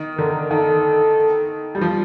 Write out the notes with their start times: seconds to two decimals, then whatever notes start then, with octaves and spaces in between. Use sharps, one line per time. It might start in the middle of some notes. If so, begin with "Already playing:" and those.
Already playing: D#3
0.18 D3 A#4
0.51 D#3 A4
1.75 G3
1.81 F3